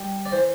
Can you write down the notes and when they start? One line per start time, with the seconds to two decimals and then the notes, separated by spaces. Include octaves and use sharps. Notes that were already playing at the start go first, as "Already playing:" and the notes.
Already playing: G3
0.26 D5
0.32 E3 C5